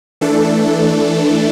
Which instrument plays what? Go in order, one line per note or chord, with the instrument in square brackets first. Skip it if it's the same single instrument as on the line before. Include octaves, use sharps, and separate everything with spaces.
[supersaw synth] E3 A3 D4 A4